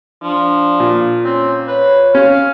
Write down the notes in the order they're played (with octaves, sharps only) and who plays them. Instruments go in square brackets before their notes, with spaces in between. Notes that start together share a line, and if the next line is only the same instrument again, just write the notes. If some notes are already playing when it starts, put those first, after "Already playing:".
[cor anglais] F3 [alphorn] D4
[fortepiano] A#2
[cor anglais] C4 [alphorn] C#4
[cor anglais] B4 [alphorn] C#5
[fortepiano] C#4 [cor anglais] F5